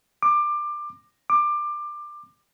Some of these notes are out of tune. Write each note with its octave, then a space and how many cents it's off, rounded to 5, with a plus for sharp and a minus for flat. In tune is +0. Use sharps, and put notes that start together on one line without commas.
D6 +20
D6 +20